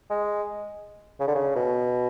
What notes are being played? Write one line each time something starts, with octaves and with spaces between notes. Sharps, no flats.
G#3
C#3
D3
C#3
B2